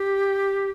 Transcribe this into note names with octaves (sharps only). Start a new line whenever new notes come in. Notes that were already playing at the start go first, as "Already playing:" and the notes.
Already playing: G4